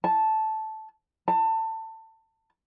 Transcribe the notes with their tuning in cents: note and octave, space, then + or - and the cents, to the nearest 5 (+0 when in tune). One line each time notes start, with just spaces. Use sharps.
A5 -10
A5 +25